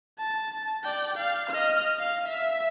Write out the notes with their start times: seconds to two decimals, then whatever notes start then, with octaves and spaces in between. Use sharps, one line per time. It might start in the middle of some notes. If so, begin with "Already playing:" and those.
0.18 A5
0.83 D5 G5
1.16 F5
1.50 D#5 F6
1.99 F5
2.28 E5